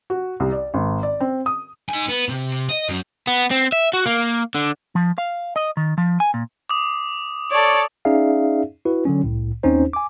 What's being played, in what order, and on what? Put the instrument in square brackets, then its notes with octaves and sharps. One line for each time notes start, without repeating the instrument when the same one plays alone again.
[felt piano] F#4
C2
D5
G#1
D5
C4
D#6
[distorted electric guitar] D#4 G#5
B3
C3
D#5
F#2 F#3
[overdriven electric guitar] B3
C4
E5
F#4
A#3
D3
[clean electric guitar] F3
F5
D#5
D#3
F3
G#5
A#2
[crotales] D6 D#6
[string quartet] A4 D5 [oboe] C#5
[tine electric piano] C#4 D#4 G#4 D5 E5 F5
E4 F#4 B4
D3 F#3 C#4
C2 A2
D#2 C4 C#4 D#4 C5
G#5 D6